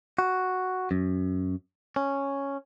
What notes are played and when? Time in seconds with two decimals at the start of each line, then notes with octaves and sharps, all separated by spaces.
0.19 F#4
0.91 F#2
1.96 C#4